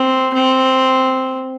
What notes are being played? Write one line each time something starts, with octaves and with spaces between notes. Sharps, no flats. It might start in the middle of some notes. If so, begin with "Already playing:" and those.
Already playing: C4
C4